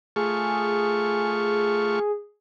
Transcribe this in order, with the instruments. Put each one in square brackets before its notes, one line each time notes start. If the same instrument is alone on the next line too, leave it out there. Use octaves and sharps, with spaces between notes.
[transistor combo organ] A3 F4 C#6 [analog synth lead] G#4